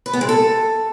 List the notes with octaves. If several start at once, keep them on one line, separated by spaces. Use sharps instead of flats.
B4
B3
G#3
A4